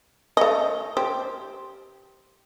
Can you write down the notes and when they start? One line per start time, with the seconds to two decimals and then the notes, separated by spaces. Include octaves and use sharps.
0.37 A3 D#5
0.97 G4 C5